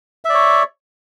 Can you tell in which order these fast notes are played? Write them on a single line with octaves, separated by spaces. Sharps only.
E5 D5 C#5